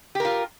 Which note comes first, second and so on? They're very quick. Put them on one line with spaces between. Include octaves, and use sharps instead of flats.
G4 A#4 F4